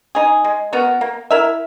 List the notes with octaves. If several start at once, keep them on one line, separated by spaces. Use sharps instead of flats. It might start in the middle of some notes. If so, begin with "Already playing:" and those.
G#3 D#4 G#4
G#3
B3 F#4 A#4
A#3
E4 A#4 E5